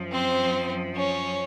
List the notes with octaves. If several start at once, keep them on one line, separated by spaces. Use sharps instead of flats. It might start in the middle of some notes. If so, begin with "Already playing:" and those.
Already playing: F#2 F3
C4 C5
C#4 C#5